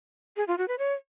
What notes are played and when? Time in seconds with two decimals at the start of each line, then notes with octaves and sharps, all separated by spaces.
0.37 G#4
0.48 F4
0.58 F#4
0.68 B4
0.79 C#5